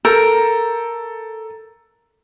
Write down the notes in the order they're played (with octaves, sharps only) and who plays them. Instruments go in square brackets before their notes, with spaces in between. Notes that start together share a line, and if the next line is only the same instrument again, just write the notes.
[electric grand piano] A4 E6 G6 [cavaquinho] A#4